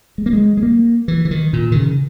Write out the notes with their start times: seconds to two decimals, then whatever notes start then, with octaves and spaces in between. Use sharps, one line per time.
0.18 G#3
0.26 A#3
0.33 G#3
0.58 G#3
0.63 A#3
1.08 E3
1.25 E3
1.31 D#3
1.53 A#2
1.72 D#3
1.75 C#3